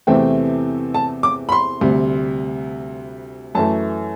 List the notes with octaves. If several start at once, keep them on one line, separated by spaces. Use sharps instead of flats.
E2 C3 E3 A3 C4 G5
A5
D6
B5
C6
D2 C3 G3
F#2 E3 A3 A5